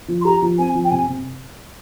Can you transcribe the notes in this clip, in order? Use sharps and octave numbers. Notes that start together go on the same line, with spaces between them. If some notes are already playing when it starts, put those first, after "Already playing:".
F3
C6
G4 A#5
F3
C4 G#5
F3
G5
C3 G#5
C3